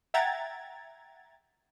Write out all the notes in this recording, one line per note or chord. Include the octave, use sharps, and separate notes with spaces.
E5 F#5 G5 A#5 G#6 A6